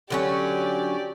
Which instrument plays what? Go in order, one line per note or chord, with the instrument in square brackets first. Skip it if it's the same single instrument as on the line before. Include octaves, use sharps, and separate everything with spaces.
[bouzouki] D3 F#3 C#4 [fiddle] G4 D5